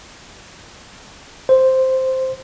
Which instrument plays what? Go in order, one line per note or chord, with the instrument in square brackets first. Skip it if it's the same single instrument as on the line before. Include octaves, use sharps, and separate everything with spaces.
[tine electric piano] C5